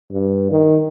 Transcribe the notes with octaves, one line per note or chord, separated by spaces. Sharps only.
G2
D#3